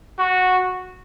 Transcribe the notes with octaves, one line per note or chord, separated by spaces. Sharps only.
F#4